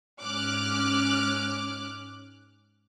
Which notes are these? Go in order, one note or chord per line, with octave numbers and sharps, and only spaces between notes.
G#2 C#4 D6 F6 F#6